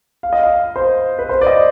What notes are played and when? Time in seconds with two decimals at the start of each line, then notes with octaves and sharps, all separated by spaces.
0.23 F5
0.33 D#5
0.43 F5
0.76 C5
1.19 B4
1.29 C5
1.41 D5
1.47 D#5